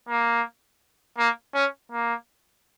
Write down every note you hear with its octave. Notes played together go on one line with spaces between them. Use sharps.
A#3
A#3
C#4
A#3